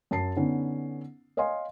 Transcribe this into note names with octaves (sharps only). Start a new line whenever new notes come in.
F#2 A5 C7
D3 B3 C#4 D#4
C#5 D#5 F5 G#5 C6